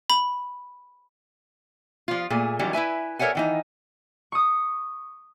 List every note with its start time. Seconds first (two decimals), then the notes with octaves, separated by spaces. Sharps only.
0.10 B5
2.08 F3 F4
2.30 A#2 A3 G#4
2.59 D#3 E3 F#3 G3 C#4
2.73 E4 B4 E5 G#5
3.19 A4 A#4 C#5 E5 F#5 G#5
3.35 D#3 E3 D#4
4.32 C#6 D#6